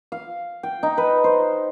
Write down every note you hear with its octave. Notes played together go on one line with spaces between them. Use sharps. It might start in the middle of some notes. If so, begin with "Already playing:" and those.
F5
G5
D#4
B4
C5